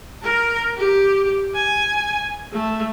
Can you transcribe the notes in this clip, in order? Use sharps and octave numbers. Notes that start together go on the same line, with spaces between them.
A#4
G4
G#5
A3